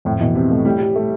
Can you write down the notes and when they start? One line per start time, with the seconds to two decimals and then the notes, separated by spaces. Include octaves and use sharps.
0.05 F2 A2
0.21 B2 E3
0.35 C3 C4
0.51 A3
0.65 A2 G3
0.80 G3
0.96 A3 G4